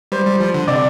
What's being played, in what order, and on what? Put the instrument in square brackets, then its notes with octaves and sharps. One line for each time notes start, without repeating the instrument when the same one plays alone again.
[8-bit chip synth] G3 [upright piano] C5
[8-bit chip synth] G3
F3
D3
[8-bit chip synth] C3 [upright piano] D5